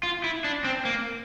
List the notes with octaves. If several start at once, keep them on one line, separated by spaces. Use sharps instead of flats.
F4
E4
D4
C4
A#3